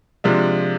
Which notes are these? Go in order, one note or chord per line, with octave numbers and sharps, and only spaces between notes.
C3 F3 G#3 D4